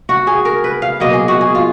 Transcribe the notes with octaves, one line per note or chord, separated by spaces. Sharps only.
F#4
G#4
A#4
B4
F5
B2 F#3 A#3 D#5
G#4
F#4
G#4
F4